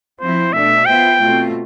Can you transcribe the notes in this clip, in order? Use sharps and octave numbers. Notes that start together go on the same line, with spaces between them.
F3 C4 E4 C5
B2 A3 D4 A4 E5
B3 F4 C5 E5 G5
B2 A3 C4 F4